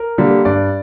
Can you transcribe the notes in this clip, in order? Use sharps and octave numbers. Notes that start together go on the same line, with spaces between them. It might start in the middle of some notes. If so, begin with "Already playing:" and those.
Already playing: A#4
D3 G3 A#3
G2 D5